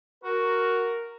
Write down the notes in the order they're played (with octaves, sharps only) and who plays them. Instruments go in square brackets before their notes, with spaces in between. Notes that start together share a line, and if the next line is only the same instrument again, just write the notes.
[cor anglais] F#4 [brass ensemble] A#4